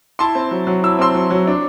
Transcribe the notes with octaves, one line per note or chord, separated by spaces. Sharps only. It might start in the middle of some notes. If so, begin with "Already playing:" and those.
E4 A5 C6
C4
F#3
F#3
E4 E6
C4 C6 E6
F#3
F#3
D4